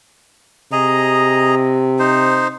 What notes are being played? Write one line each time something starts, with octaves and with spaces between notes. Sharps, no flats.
C3 G#4 D#5 A#5
D#4 C5